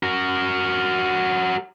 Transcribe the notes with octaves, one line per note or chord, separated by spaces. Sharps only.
F#4 A#4